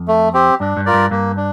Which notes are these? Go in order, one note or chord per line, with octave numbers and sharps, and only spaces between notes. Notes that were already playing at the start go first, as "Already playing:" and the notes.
Already playing: F2
A3
C4 G4
G2 D4
G2
F4 A#4 D5
G2
G2 A#3
D4